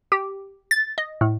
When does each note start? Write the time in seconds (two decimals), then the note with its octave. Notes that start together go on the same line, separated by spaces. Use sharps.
0.12 G4
0.71 A6
0.98 D#5
1.21 A2